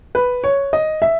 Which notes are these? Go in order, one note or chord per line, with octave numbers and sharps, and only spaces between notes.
B4
C#5
D#5
E5